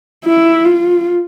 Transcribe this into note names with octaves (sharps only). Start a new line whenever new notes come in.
E4
F4